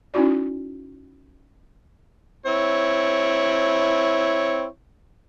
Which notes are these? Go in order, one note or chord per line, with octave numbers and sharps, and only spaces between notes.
C#4 D#4 E4 F#4 D5
C4 E4 C#5